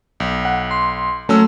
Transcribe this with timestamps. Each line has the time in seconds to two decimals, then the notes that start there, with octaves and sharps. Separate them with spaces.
0.20 B1
0.45 F#5
0.71 C6
1.29 F#3 A3 C#4 E6